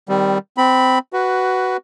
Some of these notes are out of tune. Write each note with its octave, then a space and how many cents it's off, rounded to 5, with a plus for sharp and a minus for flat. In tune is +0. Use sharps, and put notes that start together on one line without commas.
D#3 +0 G3 +0 C4 -30
C4 -15 B5 +0
F#4 +10 B4 +0